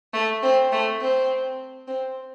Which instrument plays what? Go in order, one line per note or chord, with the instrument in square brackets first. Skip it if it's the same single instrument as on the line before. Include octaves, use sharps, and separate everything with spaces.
[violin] A3
C4
A3
C4
C4